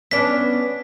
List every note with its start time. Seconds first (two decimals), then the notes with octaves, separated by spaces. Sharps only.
0.11 B3 C#4 D4 B6